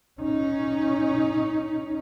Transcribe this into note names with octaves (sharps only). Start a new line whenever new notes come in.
C#4 D#4